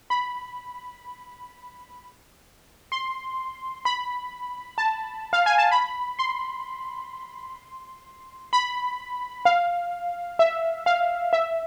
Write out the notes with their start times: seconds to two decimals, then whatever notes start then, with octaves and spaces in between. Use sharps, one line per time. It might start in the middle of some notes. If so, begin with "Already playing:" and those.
0.10 B5
2.92 C6
3.85 B5
4.78 A5
5.33 F5
5.46 G#5
5.58 A5
5.71 B5
6.19 C6
8.53 B5
9.45 F5
10.39 E5
10.86 F5
11.33 E5